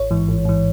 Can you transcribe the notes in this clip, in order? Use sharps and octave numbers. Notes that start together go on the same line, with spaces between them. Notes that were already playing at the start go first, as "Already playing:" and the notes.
Already playing: A1 C#5
G#2 E3
A1
G#2 E3